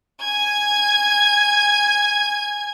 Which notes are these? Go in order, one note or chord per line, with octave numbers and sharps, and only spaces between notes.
G#5 G#6